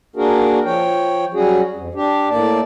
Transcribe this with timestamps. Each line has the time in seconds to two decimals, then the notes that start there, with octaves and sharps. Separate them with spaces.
0.16 A#3 D4 F#4 G#4 A#4
0.65 F3 C#5 G5
1.34 F#3 G3 C#4 F#4 G#4
1.75 F2
1.95 D4 G4
2.30 A2 A#3 D5 A5